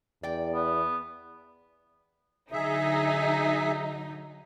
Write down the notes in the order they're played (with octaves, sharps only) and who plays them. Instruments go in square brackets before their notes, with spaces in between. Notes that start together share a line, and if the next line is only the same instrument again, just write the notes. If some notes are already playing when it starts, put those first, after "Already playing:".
[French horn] E2 [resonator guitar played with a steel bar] D5 G5
[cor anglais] B3
[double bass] D3 F#3 [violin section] D#4 [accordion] G#4 E5